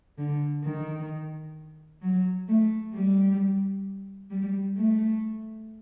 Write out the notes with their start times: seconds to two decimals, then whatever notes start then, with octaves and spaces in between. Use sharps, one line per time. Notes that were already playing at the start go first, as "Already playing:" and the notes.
0.18 D3
0.64 D#3
2.02 F#3
2.48 A3
2.94 G3
4.31 G3
4.77 A3